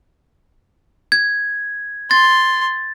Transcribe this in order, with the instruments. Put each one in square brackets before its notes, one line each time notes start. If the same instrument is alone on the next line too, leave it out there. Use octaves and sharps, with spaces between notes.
[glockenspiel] G#6
[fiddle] C6 [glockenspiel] A6